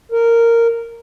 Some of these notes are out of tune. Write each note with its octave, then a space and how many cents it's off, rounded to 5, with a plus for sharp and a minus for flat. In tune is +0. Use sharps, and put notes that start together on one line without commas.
A#4 -10